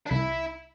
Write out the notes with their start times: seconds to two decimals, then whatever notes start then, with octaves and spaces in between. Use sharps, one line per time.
0.06 D4
0.11 C2 E4